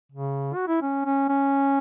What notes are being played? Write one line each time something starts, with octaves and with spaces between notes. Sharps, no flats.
C#3
F#4
E4
C#4
C#4
C#4